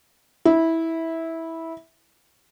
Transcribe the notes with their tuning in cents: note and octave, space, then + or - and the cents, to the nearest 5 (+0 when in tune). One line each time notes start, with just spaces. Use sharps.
E4 -15